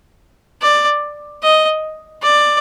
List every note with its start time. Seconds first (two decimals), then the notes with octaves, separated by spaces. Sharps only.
0.62 D5
1.43 D#5
2.22 D5